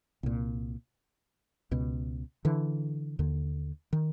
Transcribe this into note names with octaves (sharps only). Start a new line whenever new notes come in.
C2 A#2
C#2 B2
D3 E3
D#2 D3
D#3